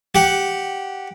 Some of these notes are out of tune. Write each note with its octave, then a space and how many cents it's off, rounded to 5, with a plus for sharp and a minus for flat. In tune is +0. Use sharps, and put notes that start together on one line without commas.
G4 -10 F#5 +0